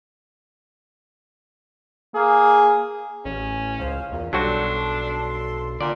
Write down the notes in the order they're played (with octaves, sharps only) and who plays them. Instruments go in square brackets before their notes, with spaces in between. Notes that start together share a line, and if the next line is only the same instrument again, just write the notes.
[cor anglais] A#3 [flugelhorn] G#4
[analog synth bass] A1 [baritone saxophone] C#4
[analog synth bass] C#2 [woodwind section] G#4 C5 F5
[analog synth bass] E2 [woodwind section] A#2
[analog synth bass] B1 [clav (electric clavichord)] F#3 G3 F#4 [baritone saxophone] D4 [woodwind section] A4 C6
[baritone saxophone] A#2 [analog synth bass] D3 [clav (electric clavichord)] D5